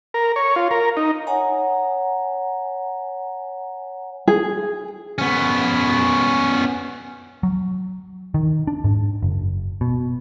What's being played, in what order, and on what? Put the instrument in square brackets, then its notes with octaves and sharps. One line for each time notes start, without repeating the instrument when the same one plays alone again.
[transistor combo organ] A#4
C#5
F4
A#4
D#4
[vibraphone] C#5 F#5 G#5 A#5
[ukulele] G#4
[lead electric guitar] B3 C#4
[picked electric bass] F#3
D#3
D4
G#2
F#1
B2